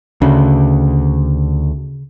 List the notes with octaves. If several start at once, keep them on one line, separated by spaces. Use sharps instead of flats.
D2 C#3